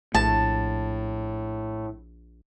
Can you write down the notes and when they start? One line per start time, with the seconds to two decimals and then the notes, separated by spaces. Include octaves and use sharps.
0.15 A#1 A2 A5